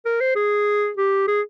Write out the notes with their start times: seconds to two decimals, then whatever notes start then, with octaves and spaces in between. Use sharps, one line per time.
0.06 A#4
0.21 C5
0.36 G#4
0.97 G4
1.28 G#4